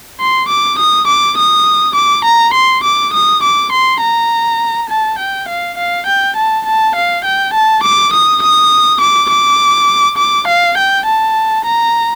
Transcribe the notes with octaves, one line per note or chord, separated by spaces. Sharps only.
C6
D6
D#6
D6
D#6
D6
A#5
C6
D6
D#6
D6
C6
A#5
A5
G5
F5
F5
G5
A5
A5
F5
G5
A5
D6
D#6
D#6
D6
D6
D6
F5
G5
A5
A#5